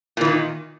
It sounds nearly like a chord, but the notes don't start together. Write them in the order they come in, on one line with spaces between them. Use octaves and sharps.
A#2 E3 D#3